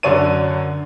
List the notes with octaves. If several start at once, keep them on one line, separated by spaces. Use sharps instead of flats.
F#2 D3 F#3 C#5 D5 D#7